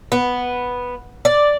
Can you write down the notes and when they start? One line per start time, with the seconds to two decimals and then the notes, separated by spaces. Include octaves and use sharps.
0.12 B3
1.25 D5